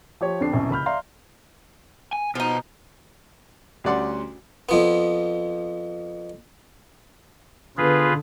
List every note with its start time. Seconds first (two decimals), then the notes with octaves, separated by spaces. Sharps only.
0.21 F3 G4 C#5
0.40 F2 D3 D4 C7
0.52 C2 F#2 B2
0.71 C#2 B5 F6 G6
0.86 D5 E5 F5 A#5 C6
2.13 G#5
2.35 B2 F3 D#4
3.84 D2 G3 C#4 D5 F#5 C6
4.69 F2 F3 B3
7.77 D3 B3 F4 G#4 B4